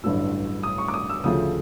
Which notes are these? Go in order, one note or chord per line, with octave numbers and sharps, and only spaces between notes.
A1 G2 D3 F#3 E6
D#6
C#6
D6
D#6
E6
D2 C#3 F3 A3 D#6